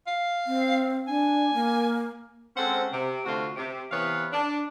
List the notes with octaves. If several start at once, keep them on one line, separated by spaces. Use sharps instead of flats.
F5
C4
D4 G#5
A#3
G#3 C4 C#4 A4 C5 F#5
C3
D3 A3 C4 F4 F#4
C3
C3 E3 B3 B4 C#5 F5
D4